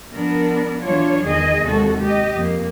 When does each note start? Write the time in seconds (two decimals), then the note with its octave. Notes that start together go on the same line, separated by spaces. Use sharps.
0.13 F3 B3 D4 A#4
0.82 E3 F#3 D4 F4 C#5
1.25 E2 D#3 E3 G#4 D#5
1.63 D#2 C3 G#3 A#3 F#4 A4
2.02 G4 D#5
2.33 F2 A#3